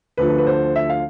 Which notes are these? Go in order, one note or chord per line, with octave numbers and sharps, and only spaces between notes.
D2 D3 F3 B4
B4
C5
E5
F5